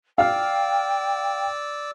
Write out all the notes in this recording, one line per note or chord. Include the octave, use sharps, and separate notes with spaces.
D5 F5 G5 E6 F6